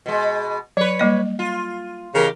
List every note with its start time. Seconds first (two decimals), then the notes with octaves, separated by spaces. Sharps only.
0.06 B2 G#3
0.77 F#3 B4 C#5
0.99 G3 A#3 D#5
1.39 F4
2.15 E2 C#3 G4 A#4